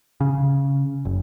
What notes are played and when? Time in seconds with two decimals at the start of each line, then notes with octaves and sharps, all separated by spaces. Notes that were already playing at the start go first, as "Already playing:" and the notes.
0.21 C#3
1.05 F#1